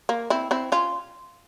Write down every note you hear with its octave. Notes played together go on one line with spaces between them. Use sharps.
A#3
C4 E4
C4 E4
C#4 F4